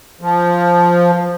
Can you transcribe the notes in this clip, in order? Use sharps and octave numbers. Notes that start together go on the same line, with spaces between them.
F3